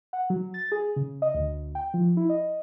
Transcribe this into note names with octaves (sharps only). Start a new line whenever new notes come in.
F#5
F#3
A6
G#4
C#3
D#5
D2
G5
F3
E4
D#5